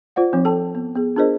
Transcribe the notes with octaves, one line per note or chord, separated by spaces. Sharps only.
F4 C5 D5 F#5
F3 C4 D#4
A4 G5 A5
B3
B3 G#4
D4 F4 G#4 A#4 C5 D#5